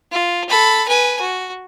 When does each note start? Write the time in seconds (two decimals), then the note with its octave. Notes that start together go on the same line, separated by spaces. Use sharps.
0.12 F4
0.49 A4 B5
0.88 B4 G#5
1.21 F#4